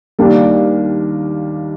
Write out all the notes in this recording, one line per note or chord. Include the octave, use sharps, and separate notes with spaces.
D#2 D#3 G3 A#3 D4